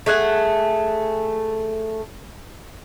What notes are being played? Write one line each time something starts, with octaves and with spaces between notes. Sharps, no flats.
A3 G#4 F#5 G#5